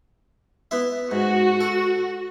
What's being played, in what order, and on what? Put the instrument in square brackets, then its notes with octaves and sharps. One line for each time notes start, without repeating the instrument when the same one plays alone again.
[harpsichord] B3 E4 E5
[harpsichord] G#2 [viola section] F#4
[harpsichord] A4